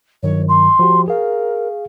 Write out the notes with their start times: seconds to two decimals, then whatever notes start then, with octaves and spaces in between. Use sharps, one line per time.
0.23 G2 D#3 F#3 C#5
0.48 C6
0.79 F3 F#4 G4
1.08 G#4 A#4 F5